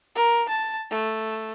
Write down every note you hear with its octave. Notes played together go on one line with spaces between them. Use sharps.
A#4
A5
A3